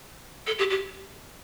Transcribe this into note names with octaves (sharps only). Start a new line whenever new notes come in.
A4
G4
G4